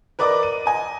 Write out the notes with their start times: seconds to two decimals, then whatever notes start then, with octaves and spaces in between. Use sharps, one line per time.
0.19 A#4 B4 D5 D#5 D6
0.43 D#7
0.66 D#5 G#5